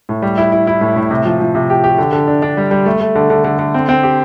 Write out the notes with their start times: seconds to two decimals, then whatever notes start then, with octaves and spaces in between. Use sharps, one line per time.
0.09 A2
0.22 G3
0.38 E4
0.52 E4
0.67 E4
0.81 A2
0.96 A2
1.10 C3
1.26 F3
1.40 F3
1.55 C3
1.70 G4
1.84 G4
1.98 D3
2.13 D3
2.27 D4
2.42 D4
2.57 G3
2.71 G3
2.86 A3
3.01 A3
3.15 D3
3.30 D3
3.44 D3
3.59 D3
3.74 C4
3.89 C4
4.03 G4